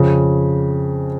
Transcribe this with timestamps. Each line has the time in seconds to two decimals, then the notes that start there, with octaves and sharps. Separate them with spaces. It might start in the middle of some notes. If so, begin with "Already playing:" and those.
Already playing: F2 C#3